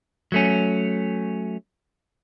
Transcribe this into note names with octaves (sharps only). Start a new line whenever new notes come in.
F#3 A3 C#4